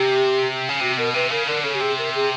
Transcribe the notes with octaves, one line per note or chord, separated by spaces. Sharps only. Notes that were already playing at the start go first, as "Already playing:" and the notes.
Already playing: C3 G4
C#3
C3 F#4
B2 A#4
C3 B4
C#3 A#4
D3 A#4
C#3 A4
G4
C3 G#4
A#4
G#4